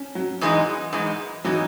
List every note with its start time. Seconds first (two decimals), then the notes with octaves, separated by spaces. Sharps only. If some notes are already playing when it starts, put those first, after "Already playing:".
Already playing: C#4
0.15 F#3
0.41 G#2 E3 G#3 D#4
0.93 G#2 E3 G#3 D#4
1.44 E3 F#3 G#3 D#4